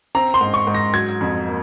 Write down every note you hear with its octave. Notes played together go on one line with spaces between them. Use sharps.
C4 A#5
C6
G#2
C#6
G#2
A#6
F#3 G#6
F2
A#3